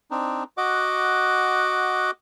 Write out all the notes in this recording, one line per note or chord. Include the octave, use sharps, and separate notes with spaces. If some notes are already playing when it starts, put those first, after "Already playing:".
C4 D4 D#4
F#4 D#5 F#5 D6